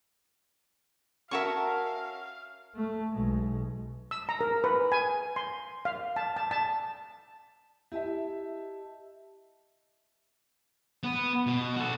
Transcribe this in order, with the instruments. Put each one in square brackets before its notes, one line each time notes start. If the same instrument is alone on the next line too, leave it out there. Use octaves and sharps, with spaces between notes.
[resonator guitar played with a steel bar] C#4 F#4 A#4 [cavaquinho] E5 A5 C#6 [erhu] F5
[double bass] A3
B1 G#3
[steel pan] E6
A#5
A#4
B4
G#5
C6
F5
A5
A5
A5
[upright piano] E4 E5 [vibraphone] G4 D#5 A5
[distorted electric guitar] B3
B2
F#4 A4